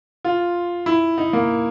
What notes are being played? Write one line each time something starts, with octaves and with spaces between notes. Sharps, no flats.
F4
E4
D#4
A#3